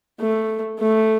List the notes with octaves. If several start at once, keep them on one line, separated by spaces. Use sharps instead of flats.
A3
A3